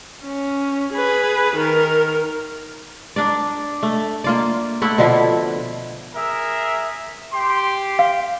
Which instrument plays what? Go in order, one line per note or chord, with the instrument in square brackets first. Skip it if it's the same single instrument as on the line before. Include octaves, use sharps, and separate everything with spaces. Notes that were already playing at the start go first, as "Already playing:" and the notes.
[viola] C#4
G#4 B4
D#3 A#4
[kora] D4 A#4 D5
A3
A#3 F4 D5
A3 E4 F#5
B2 D3 F3 E4
[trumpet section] G#4 A#4 E5
G4 C6
[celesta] F5